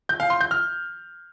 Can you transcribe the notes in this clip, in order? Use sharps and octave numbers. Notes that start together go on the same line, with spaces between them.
G6
F5
C6
G6
F6